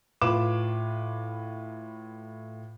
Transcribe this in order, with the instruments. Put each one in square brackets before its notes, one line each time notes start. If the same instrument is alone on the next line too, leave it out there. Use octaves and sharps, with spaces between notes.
[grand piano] A2 F4 B4 D6 E7